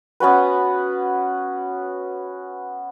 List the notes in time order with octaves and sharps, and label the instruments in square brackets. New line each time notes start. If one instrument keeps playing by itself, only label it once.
[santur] B3 C#4 F#4 B4